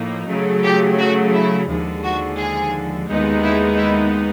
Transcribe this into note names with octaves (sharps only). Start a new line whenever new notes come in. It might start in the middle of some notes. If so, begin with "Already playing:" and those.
Already playing: A2 F3 A#3 D#4
C#3 F#3 A3
G4
F#4
E4
D#2 D3 F3 G#3
F#4
G#4
D#2 D#3 G#3 B3 D#4
E4
E4